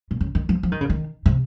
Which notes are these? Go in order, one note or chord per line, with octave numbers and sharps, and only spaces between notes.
A#2
C#3
D#3
F3
F3
D#3
C#3
D#3
C3